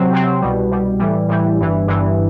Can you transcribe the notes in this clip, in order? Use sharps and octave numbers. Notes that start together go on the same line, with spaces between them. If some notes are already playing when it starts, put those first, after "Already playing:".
Already playing: C3 F#3 C4
C3 F#3 C4
C2 B2 G3
C2 B2 G3
A2 E3 G3
A2 E3 G3
G1 G2 E3
G1 G2 E3